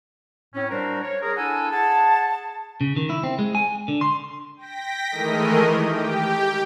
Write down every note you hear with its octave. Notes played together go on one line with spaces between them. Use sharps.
A2 C4 C#4
G3 D4 F#4 A#4 C5
C#5
G#4 A#4
D4 E4 A4 F#5 G#5
G#4 F#5 A5
C#3
D#3
E4
C4
G#3
G#5
D3
C6
G5 A#6 B6
D#3 E3 G#3 A3 A#4 D#5
G4 G5